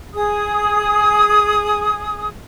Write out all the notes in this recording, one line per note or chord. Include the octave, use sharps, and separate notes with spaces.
G#4 D#6